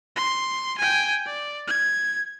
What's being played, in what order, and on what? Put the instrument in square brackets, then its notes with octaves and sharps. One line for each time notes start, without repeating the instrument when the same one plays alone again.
[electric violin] C6
G5 G#5
D5
G#6